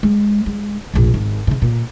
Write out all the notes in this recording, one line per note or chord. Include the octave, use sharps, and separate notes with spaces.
G#3
G#3
F1 A#1
G#1
A#2 C#3
A#2